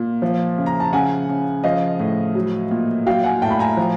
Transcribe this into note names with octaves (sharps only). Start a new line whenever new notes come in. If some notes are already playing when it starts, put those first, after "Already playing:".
Already playing: A#2
F3
C#3
A#5
A5
C#3 F#5 G#5
C#3
F3 D#5 F5
A2
F#3
A#2
F#3 F5 G5
F#5 G#5
A2 G5 A5
B5
G#5 A#5
F3